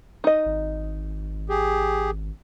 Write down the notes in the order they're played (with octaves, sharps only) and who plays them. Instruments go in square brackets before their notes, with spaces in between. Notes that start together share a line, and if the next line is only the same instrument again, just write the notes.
[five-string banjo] D#4 D#5
[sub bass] G#1
[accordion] G4 G#4